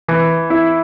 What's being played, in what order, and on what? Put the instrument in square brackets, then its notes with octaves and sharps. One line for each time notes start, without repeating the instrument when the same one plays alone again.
[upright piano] E3
E4